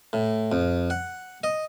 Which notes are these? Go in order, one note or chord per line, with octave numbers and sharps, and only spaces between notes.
A2
F2
F#5
D#5